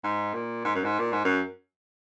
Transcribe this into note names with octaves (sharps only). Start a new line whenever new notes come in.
G#2
A#2
G#2
F#2
G#2
A#2
G#2
F#2